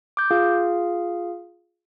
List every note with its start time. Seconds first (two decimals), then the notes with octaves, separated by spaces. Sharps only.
0.17 D6 G6
0.31 F4 G#4 F5